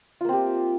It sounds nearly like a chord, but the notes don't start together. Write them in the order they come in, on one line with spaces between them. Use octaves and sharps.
F4 A#3 C4 G4